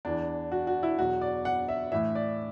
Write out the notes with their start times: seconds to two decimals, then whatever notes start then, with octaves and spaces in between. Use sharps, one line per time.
0.05 E2 E3 D4
0.52 F#4
0.67 F#4
0.83 E4
0.99 E2 B2 F#3 F#4
1.21 D5
1.45 F#5
1.69 E5
1.92 A2 E3 E5
2.15 D5